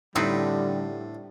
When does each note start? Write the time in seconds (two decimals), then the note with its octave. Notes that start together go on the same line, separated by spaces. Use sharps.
0.16 A2 D3 G3 C4 D#4 B4